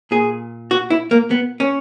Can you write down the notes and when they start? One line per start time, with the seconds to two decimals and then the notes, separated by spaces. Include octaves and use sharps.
0.11 A#2 G#4
0.71 F#4
0.90 E4
1.11 A#3
1.31 B3
1.60 C#4